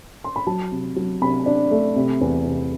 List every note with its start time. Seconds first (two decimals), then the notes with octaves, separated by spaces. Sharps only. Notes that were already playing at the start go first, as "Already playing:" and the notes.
0.24 C6
0.36 B5
0.47 F#3 A5
0.72 C3
0.96 F#3
1.22 C3 B5
1.46 D4
1.71 A3
1.96 C3
2.21 E2
2.46 C3